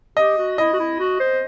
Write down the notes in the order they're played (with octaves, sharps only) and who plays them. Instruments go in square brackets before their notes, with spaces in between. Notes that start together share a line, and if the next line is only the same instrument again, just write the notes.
[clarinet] G4 [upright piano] D#5
[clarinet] F#4
[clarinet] E4 [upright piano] D#5
[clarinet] F#4
E4
F#4
C5